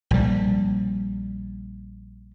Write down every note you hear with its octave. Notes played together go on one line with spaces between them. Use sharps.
A#1 G3